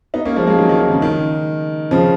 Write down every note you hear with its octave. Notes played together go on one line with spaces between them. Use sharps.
B3 D#4
A#3 C#4
F3 G#3
F3 G#3
D#3 F#3
D#3
D#3
C#3
D#3
C#3 F3